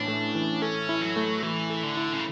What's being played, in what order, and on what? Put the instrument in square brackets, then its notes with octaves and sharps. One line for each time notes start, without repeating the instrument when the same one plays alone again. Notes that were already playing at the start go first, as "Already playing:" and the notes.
Already playing: [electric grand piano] A2 E3 C#4 [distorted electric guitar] D4
[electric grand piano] A3
E3
[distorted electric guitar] C#4 [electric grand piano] A4
[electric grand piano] E4
[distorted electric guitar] F#3
[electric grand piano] A3
[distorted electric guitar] E3 [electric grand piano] A3
[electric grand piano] A4
[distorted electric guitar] D3
[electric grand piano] E4
[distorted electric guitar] C#3